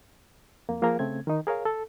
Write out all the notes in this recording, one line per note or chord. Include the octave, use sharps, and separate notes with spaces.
F2 A#3
F3 A#3 F4 G#4 A#4
C#3 A3 C4 G#6
D#3 D#4
G#4 A#4 C#5 F5
A4